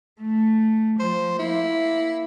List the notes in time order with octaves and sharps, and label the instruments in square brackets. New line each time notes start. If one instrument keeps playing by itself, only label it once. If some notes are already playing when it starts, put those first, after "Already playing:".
[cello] A3
[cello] F3 [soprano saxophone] C5
[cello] A#3 [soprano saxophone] E4